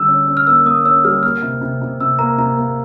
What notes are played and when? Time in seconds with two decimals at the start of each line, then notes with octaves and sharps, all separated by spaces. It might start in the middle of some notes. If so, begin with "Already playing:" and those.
Already playing: D3 G3 E6
0.08 C#4
0.27 C#4
0.37 F6
0.47 A#3 E6
0.65 A#3 D#6
0.85 C#4 E6
1.04 G3 F6
1.23 A#3 F6
1.42 C3
1.61 C3
1.81 C3
2.00 C3 E6
2.19 A#3 A#5
2.38 C3 A#5
2.58 A#3